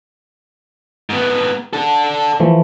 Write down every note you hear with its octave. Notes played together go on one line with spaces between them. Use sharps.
G#2 B3
D4 A4
E3 F3 A3